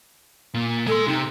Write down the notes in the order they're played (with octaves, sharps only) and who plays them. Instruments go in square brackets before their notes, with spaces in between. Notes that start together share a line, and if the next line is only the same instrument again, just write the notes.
[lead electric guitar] A#2
[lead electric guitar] G#3 C6 [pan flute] A4
[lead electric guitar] C3 [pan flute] D#4